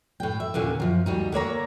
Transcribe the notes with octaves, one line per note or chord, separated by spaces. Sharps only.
A2 G5
E5
D#2 A#2 D3 C#4
F#2 F3
D2 G3 D#4
D3 A#3 C#5 A#5